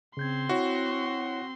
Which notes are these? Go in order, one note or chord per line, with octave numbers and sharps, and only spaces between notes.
C#3 C4 C6 G6 G#6
E4 F#4 C#5